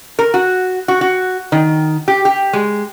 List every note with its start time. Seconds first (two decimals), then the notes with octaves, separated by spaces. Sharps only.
0.19 A#4
0.34 F#4
0.88 F#4
1.01 F#4
1.52 D#3
2.08 G4
2.25 G4
2.53 G#3